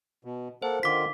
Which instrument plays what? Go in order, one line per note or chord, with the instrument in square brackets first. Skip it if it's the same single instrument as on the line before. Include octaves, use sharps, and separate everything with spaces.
[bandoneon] B2
[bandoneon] A#3 A4 F#5 [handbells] C5
[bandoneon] D3 D#3 F4 [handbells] D6 B6